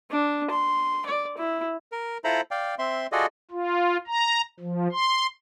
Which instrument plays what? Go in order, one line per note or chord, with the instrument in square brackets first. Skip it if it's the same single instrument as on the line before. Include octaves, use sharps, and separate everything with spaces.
[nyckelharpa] D4
C6
D5
E4
[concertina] A#4
E4 F4 A4 C5 A#5 B5
D5 F5 G5
C4 E5 C6
F4 F#4 G#4 A4 D5 D#5
[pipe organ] F4
A#5
F3
C6